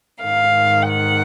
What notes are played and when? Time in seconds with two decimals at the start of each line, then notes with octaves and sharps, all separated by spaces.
0.23 G#2 D#3 F5
0.89 F#5